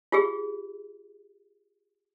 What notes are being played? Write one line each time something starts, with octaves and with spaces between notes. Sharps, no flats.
F4 G4 G#4